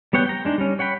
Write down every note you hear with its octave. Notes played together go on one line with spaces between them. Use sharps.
G3 B3 C#5 F#5 G5
G5 A#5
G#3 D4 D#4
G3 C#4
C#5 F#5 G5 B5